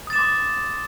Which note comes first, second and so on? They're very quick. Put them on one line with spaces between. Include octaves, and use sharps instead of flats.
D#6 A6 E7 D6 C6